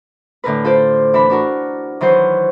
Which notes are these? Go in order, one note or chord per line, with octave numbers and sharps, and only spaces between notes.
A2 D3 A#4 B4
F4 A4 C5 D5
E3 D4 E4 B5
D4 F#4 A#4
D#3 E3 F#3 C5